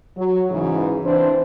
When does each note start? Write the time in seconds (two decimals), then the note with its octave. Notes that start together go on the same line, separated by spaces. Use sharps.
0.16 F#3
0.49 G#2 C#3 E3
1.04 E3 C4 D4 C5